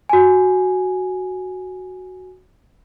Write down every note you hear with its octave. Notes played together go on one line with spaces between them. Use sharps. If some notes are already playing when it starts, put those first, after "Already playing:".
F#4 G#5